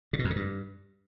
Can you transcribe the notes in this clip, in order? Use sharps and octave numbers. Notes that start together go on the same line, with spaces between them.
C#3
B2
F2
D3
G2